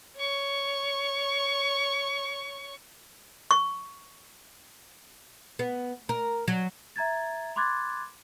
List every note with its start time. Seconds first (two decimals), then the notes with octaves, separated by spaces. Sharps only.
0.17 C#5 C#6
3.51 C#6
5.59 B3
6.09 A#4
6.48 F#3
6.96 E5 A#5 G#6 A6
7.56 B5 C6 D6 F#6 G#6 A6